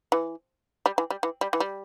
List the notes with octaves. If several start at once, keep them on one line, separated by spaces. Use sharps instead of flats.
E3
G3
E3
G3
E3
G3
E3
G3